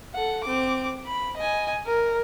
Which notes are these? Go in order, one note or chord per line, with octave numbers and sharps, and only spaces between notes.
A4 F#5
C4 D6
B5
D#5 G#5
A#4